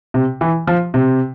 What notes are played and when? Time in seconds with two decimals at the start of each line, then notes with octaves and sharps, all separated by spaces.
0.14 C3
0.41 E3
0.67 F3
0.94 C3